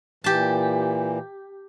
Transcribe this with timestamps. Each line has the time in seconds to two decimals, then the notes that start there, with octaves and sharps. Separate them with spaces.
0.24 A#2 E3 G4 A5